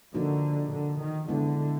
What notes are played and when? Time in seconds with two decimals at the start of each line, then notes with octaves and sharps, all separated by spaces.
0.14 D3 F3 A#3 D#4 F#4
0.72 D3
1.00 D#3
1.29 D3 G#3 B3 E4